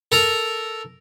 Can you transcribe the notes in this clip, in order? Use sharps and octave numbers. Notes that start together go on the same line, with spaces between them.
A4 A#4